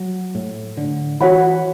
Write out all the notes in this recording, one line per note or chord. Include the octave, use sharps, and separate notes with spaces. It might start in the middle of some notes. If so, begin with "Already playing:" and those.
Already playing: F#3
A2
D3
E3 F#4 C#5 F#5 B5